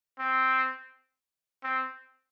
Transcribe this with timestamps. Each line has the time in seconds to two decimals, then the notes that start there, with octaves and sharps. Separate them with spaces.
0.19 C4
1.64 C4